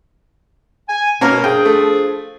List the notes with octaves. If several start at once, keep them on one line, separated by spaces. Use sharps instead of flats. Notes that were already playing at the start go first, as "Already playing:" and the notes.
G#5
B2 A#3 C#4 A#4
F3 D4 G#4 G5
A3